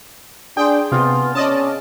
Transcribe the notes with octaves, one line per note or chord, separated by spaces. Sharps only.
D4 G#4 G5 C6
C3 B3 F4
C#4 D5 D#5 A5